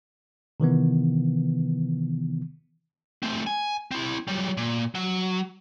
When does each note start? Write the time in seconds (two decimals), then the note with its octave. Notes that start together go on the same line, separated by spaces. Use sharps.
0.60 C3 D#3 E3 B3
3.23 A3 C4
3.47 G#5
3.91 C4 E4
4.28 F#3 G3
4.57 A#2
4.95 F#3